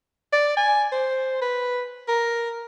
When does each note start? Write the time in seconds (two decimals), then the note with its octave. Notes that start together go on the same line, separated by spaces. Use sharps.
0.33 D5
0.57 G#5
0.92 C5
1.41 B4
2.08 A#4